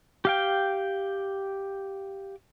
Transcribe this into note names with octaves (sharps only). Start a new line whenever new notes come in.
G4 F5 G5